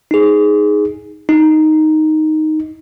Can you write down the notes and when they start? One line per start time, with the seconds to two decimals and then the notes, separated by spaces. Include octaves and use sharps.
0.11 D#4 G#4
1.29 D#4